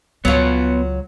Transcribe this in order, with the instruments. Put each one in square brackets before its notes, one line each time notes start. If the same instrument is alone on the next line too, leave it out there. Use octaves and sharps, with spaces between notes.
[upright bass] C#2 [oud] F#3 F4 [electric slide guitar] B3 C#5